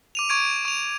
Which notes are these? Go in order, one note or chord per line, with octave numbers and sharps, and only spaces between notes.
D6 D#7 F7
C#6 G#6 D7
C#6 F7